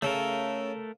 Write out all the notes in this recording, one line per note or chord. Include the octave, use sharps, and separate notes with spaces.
C#3 A3 A4 A#4